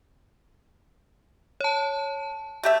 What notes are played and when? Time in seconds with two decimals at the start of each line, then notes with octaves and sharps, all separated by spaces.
1.61 C#5 A5
2.63 A3 G4 E5